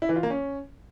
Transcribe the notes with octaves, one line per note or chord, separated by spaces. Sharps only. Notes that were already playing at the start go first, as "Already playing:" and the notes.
E4
E3
F4
A#3
C#4